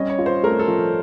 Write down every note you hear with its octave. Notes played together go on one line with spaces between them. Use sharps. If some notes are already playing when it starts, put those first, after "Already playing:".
Already playing: G3 C#4 D#5
C#5
F4
C5
A3 A#4
A4
F3